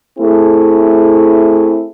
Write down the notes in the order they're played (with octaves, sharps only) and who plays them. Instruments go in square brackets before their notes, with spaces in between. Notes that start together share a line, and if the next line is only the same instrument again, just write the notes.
[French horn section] A3 C4 E4 G#4